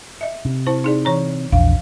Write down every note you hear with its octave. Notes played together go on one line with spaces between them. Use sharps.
D#5 E5
C3
E4 C5 A5
D#4 G#4 D5
E3 C#5 A#5
A#1 E2 D4 F5